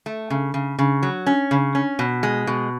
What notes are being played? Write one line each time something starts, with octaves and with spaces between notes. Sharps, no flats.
A3
C#3
C#3
C#3
F#3
C#4
C#3
C#4
B2
G#3
B2